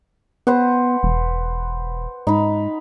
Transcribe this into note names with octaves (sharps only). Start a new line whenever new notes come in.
B3 B4 C5 F#5
E1
G#2 D#4 B5